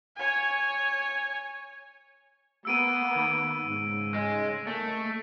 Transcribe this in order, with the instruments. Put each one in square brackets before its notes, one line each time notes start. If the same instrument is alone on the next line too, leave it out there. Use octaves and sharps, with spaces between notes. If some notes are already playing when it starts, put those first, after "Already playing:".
[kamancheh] C#5 G#5
[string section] A#3 B3 [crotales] E6 D7 D#7
[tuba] D#3
[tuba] G#2 [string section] C#3
[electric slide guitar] G#3
[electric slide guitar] A3 [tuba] A#3